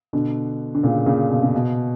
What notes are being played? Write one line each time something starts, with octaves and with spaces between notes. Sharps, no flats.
B2 D3
D3
A#2 C#3
A#2 C#3
B2
C#3
B2